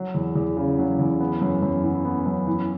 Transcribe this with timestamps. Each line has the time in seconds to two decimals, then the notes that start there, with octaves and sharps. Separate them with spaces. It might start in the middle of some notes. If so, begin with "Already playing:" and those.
Already playing: F#3
0.15 E2
0.36 E2
0.57 C#3
0.78 F#3
0.99 E2
1.20 B3
1.41 F#2
1.62 F#2
1.83 E3
2.05 B3
2.26 F#2
2.47 E3